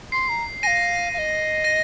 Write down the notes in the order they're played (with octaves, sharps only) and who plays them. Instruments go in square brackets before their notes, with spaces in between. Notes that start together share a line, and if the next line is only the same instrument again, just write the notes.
[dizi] C6 [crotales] C7
[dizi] A#5
[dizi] F5 G#5 [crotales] A#6 D#7
[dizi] F5
D#5
[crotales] A#6 D#7